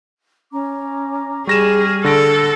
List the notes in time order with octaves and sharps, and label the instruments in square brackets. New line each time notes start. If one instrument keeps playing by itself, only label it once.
[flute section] C#4 A#5 D6
[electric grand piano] G3 A#6 E7 [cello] G#4 [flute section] C#6 F6
[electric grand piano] D3 A#6 D7 [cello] A4